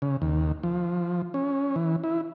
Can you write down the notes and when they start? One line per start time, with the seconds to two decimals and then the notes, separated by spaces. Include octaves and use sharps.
0.02 C#3
0.22 D#2
0.63 F3
1.34 C#4
1.76 E3
2.04 E4